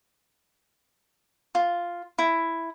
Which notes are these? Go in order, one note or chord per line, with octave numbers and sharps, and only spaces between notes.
F4
E4